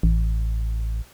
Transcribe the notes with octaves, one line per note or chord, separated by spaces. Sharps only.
A1